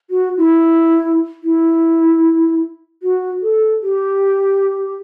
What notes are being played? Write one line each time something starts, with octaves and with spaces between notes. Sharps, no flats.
F#4
E4
E4
F#4
A4
G4